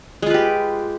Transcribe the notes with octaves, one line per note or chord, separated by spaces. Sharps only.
G#3 F4 G4 B4